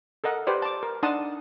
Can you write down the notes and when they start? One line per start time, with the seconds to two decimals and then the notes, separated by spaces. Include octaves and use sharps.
0.24 A4 A#4 D#5 F#5
0.47 G4 B4 C5 D5
0.62 A5 D6
0.83 A#4
1.03 D4 D#4 F#5 A5 C6 D#6